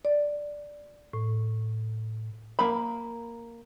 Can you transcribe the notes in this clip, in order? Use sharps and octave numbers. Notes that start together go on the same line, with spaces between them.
D5
A2
A#3 B5